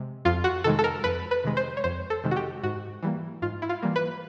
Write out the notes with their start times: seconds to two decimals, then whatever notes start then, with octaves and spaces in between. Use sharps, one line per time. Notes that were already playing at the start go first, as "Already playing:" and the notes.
Already playing: C3 G#3
0.25 F2 F4
0.44 F#4
0.64 C3 D#3 G#3 A4
0.79 A4
0.84 A#4
1.04 F2 B4
1.31 B4
1.44 C3 D#3 G#3
1.57 C5
1.77 C#5
1.84 F2 C5
2.10 A4
2.24 C3 D#3 G#3
2.31 F#4
2.36 G4
2.63 G#2 F#4
3.03 E3 G3 A#3
3.42 G#2 F4
3.62 E4
3.69 F4
3.83 E3 G3 A#3
3.96 B4